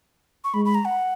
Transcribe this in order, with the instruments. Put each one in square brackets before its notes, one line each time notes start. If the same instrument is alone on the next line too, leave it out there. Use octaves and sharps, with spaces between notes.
[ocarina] C#6
[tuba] G#3 [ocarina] B5
[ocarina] B5
A#5
F#5